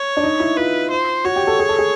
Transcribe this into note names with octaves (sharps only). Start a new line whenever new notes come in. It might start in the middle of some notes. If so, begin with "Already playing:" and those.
Already playing: C#5
D4
D#4
E4
F4 B4
C5
F#4 C#5
G4
A4
G#4
A4
G#4